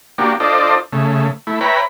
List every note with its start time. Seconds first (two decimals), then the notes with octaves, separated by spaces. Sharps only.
0.18 A#3 D4 F#4 G4
0.40 D4 F4 A4 C5 D5 D#5
0.93 C#3 A3
1.47 A3 E4
1.61 B4 C#5 E5 G5 A#5 B5